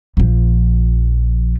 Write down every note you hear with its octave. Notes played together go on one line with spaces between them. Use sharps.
A#1 F3